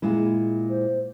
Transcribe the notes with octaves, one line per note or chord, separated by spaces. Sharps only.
A#2 G#3 E4
C5